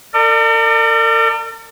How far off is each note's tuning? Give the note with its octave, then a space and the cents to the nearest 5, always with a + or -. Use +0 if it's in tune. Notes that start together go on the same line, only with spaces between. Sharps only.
A#4 -45 D5 +30